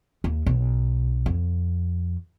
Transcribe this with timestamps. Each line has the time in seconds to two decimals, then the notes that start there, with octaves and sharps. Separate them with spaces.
0.24 D#2
0.46 B1
1.26 F2